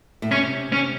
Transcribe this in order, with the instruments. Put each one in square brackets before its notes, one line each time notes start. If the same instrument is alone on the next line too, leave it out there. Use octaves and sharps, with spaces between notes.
[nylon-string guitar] A2
[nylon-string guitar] C3 [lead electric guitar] C#4
[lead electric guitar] C#4